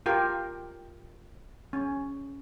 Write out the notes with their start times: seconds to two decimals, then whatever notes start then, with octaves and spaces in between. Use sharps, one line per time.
0.06 F4 G4 A#4 G5
1.73 C#4